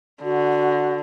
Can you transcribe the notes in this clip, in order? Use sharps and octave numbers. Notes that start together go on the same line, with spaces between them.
D3 F#4